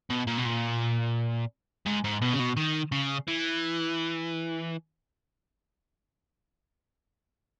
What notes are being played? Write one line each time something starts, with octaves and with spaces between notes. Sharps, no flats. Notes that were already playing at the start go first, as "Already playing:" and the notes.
B2
A#2
B2
A#2
G#2
G#2
B2
C#3
B2
D#3
C#3
E3